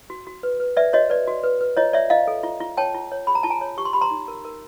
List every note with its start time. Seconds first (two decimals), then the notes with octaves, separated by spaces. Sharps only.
0.10 F#4
0.27 F#4
0.43 B4
0.60 B4
0.77 B4 D5 E5
0.93 F#4 C#5 D#5
1.10 B4 D5
1.28 F#4
1.43 B4
1.61 B4
1.77 F4 C#5 D#5
1.93 C#5 D5 E5
2.10 F4 D#5 F5
2.28 A4
2.43 F4
2.60 F4
2.77 C#5 G5 A5
2.94 F4
3.12 C#5
3.27 G#4 B5
3.35 A#5
3.43 F4 A5
3.50 G#5 A#5
3.61 C#5
3.78 G4 C#6
3.85 C6
3.93 G4 B5
4.01 A#5 C6
4.11 D#4
4.28 A#4
4.45 A#4